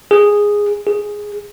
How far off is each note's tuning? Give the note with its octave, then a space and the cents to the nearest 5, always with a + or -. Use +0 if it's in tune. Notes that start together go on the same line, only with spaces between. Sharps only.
G#4 -10
G#4 -5